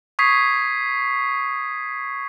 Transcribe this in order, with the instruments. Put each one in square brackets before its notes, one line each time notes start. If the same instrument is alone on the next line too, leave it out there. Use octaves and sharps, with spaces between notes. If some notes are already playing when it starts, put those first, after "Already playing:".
[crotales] C#6 D#6 G#6 B6 C7